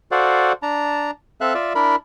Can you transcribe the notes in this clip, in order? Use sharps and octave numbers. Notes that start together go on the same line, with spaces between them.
F#4 A4 C5 D5 F5 F#5
D4 A5 A#5
C4 A4 E5 F5 F#6
F4 D5 E5
D4 E4 A#4 B5